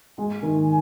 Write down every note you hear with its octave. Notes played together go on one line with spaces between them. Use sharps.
G#3 G#5
D#3